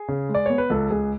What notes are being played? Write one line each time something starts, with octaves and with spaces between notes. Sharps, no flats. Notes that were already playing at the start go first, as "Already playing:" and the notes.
Already playing: G#4
C#3
G#3
D5
B3 C#5
B4
C#2 A4
C#2 G#4